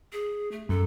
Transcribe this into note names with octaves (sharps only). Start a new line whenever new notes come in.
G#4
A3
F#2 A4